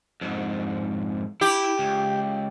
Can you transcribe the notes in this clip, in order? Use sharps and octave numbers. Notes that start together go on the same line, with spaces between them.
F2 G#2
E4 G4 B5
C#2